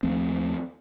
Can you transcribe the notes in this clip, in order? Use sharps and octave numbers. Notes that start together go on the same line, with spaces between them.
D#2 F3 A3 C4